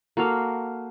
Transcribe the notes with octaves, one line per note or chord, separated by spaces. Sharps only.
A#3 F#4 A4 F5